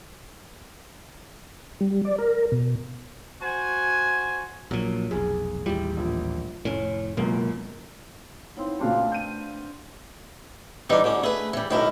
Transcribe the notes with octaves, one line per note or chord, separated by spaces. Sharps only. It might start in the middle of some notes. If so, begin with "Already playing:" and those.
G3
D5
A#4
B2
F#4 C5 G#5
A#1 A#2 F#3
F1 B1 G#4
A1 D#2 G3 E4 G4
A#1
F1 A2 C#4
C#2 F#2 B2 A#3
B3 C4 D#4 E4 C#5
A#2 C#3 F#3 A3 C4 D4 F5
G6 D#7
G#2 E3 G3 D4 D#4
A1 D2 D3 C#4
A3 G#4 B4
E3 G3
B1 F#2 A2 D#3 E4 A#4